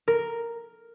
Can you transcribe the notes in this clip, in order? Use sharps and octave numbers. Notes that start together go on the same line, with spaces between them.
A#4